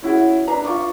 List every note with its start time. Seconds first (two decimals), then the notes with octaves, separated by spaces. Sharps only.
0.02 C#4 E4 F#4 G#4
0.47 D4 B4 A#5
0.65 F4 C#6 D6